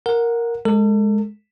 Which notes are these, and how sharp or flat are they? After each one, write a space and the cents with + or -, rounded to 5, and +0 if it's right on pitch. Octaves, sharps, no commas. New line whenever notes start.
A#4 +0 F#5 -15
G#3 +10 A4 +40